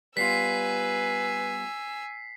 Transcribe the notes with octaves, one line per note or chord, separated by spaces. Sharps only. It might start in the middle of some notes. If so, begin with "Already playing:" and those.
G3 B3 F4 B4 G#5 E6 B6 C7